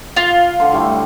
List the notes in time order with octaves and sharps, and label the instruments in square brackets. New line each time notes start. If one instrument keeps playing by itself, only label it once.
[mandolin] F4
[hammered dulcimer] D3 C6
A2 G3 A3